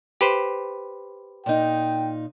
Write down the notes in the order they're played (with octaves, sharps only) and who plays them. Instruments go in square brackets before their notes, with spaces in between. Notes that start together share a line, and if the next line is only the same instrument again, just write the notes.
[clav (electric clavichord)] G4 B4 C5
[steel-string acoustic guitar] A#2 D#4 [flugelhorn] G5